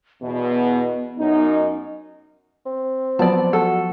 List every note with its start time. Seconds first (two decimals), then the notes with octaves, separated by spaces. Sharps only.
0.22 E2 B2 B3
1.19 F#2 D#4
2.66 C4
3.19 F3 F#3 B3 D5 A5
3.53 F#4 A4